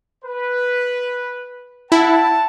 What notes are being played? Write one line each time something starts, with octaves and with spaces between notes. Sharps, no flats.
B4
E4 F#5 A5